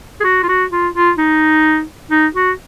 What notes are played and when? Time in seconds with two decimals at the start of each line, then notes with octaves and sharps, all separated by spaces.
0.20 G#4
0.24 F#4
0.43 F4
0.49 F#4
0.72 F4
0.95 F4
1.18 D#4
2.11 D#4
2.35 F#4